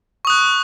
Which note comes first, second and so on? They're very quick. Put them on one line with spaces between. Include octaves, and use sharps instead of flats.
C#6 D#6 F#6